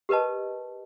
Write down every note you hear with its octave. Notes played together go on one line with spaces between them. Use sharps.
G4 A#4 B4 D#5 A5